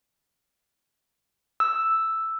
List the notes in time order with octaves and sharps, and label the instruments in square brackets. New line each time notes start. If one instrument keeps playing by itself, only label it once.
[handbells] E6